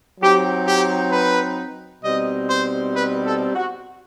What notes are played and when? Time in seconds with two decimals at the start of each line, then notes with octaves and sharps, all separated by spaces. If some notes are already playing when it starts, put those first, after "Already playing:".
0.21 F#3 C4 D#4 G4
0.68 G4
1.12 B4
2.04 B2 G3 C4 D#4 D#5
2.49 C5
2.96 B4
3.26 A4
3.55 F#4